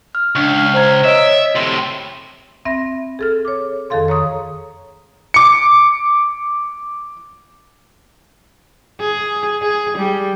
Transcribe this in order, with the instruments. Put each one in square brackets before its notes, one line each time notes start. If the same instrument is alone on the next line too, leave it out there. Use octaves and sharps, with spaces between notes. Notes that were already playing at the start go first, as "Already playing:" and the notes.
[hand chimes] F6
[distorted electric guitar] C#2 [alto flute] D4 [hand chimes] C#6
[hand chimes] F6
[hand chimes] C5 G#6 [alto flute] A#5
[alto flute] C#5 [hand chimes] D#5 D7 [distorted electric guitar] E5
[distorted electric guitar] A2 C3 [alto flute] C6
[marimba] C4 E5 B5 A#6
G#4 A4 F6
C#5 D6
F2 D#3 G#4 A4 F5 C6
C#5 A#5 C#6 D#6
[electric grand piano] D6 C#7
[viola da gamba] G#4
G#4
G3